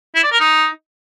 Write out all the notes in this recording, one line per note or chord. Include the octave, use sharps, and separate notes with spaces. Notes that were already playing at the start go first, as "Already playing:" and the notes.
E4
D5
A#4
D#4